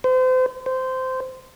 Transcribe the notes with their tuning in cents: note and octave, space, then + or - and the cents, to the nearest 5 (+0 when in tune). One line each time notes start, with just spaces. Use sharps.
C5 -35
C5 -15